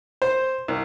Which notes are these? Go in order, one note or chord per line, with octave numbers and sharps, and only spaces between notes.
C5
C2